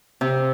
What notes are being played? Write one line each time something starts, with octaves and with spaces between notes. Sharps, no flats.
C3